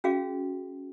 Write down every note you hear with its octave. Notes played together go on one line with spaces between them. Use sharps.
C#4 F#4 G#4 F5